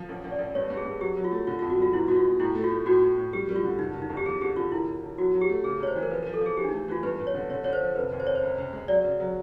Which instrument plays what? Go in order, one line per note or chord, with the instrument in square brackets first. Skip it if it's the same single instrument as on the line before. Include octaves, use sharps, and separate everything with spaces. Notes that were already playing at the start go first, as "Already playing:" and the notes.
Already playing: [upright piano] F3
A1
A1
[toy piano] D5
[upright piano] A1
[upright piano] G2 [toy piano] C#5
[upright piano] G2
[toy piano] G#4
[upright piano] G2
[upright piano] F#3 [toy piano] G4
[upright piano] F#3
[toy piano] F4
[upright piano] A3
[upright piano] D3 [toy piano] F4
[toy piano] F4
[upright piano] F2
[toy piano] F#4
[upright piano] G3 [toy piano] F4
[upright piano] B2 [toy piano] E4
[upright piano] B2 [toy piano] F#4
[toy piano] F4
[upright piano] G#3
[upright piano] A2 [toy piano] E4
[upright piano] A3
[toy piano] F4
[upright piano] A3
[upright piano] A2 [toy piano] F#4
[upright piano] A2
A2
[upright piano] G3 [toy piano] G4
[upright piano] G3
[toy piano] F4
[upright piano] D3
[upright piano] F#1 [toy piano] D#4
[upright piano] F#1
[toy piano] D#4
[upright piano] E2
[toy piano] G4
[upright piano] F3 [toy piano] G#4
[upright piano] D3 [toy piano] G4
[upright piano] D3 [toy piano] F4
[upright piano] E1 [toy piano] E4
[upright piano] E1
E1
[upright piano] F#3 [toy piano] F#4
[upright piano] F#3
[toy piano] G4
[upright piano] A3
[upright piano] C#3 [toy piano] G#4
[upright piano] C#2 [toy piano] C#5
[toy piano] C5
[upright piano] E3
[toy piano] A#4
[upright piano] F3 [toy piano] B4
[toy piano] A#4
[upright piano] F3
[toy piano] A4
[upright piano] F3 [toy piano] G#4
[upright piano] E3 [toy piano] G4
[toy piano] D4
D#4
[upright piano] A3
[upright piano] E3 [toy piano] F4
[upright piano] G2 [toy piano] B4
[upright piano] G2
[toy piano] C#5
[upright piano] D3
[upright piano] D3 [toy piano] C#5
[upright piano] D3 [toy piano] C#5
[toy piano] C5
[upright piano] F3
[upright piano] F1 [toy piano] B4
[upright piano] D#2
[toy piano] C5
[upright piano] F1 [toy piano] C#5
[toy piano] C5
[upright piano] C#2
C#2
G#3
[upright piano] F#3 [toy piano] D5
[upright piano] C#3
F#3